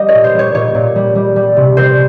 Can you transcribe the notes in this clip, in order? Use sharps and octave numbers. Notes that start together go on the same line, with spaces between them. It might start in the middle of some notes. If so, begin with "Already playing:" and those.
Already playing: G3 D#5
C#5
A#2
C5
G3
C#5
A#2 C#5
A#2
G3
G3
G3
C3
G3 C5